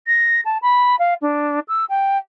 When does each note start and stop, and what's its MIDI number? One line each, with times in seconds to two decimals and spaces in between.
0.07 0.40 94
0.45 0.58 81
0.62 0.95 83
0.99 1.14 77
1.21 1.60 62
1.68 1.85 88
1.89 2.18 79